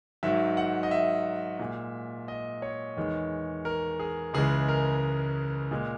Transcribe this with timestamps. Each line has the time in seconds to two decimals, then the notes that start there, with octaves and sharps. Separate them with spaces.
0.23 G#2 D#3 F#3 E5
0.57 F#5
0.83 D#5
0.91 E5
1.59 A#2 G#3
2.28 D#5
2.62 C#5
2.97 E2 D#3 G#3
3.65 A#4
4.00 G#4
4.34 C#2 C#3 E3 G#3 G#4
4.68 A#4
5.71 A#2 G#3